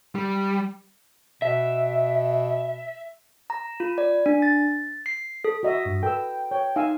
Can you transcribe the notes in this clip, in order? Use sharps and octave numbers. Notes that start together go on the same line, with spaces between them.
G3
B2 E5
A#5
F4
D5
D4
A6
C7
A4
F#4 D#5 E5
G2
A4 B4 G5 E6
C#5 G5
D#4 F5 G#5 E6